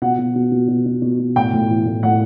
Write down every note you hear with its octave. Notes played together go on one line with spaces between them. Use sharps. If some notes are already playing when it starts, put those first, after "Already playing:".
B2 F#5
B2
B2
B2
B2
B2
B2
B2
A2 G5
A2
E3
A2
A2 F#5